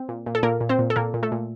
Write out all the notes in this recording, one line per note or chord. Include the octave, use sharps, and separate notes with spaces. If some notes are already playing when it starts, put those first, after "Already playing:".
Already playing: C4
A#2
A#2
A4
A#2 A#3 A#4
A#2
C4 C5
A#2
A4
A#2 A#3 A#4
A#2
A3 A4
A#2